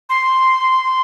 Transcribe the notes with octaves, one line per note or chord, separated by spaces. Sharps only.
C6